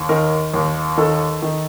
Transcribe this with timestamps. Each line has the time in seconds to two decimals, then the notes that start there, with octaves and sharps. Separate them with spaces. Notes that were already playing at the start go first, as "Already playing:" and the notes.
Already playing: D#2
0.09 D#3 A#4
0.54 D#2
0.97 D#3 A4
1.42 D#3